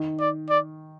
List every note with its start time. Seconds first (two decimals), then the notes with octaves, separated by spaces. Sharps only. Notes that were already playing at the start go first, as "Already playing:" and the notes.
Already playing: D#3
0.20 D5
0.50 D5